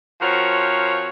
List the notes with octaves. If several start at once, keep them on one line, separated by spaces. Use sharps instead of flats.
F3 C4 F#4 A#4 C#5